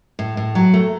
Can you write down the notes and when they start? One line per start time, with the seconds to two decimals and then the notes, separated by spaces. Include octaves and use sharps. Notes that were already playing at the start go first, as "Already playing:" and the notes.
0.19 A2
0.37 A2
0.55 F#3
0.74 A3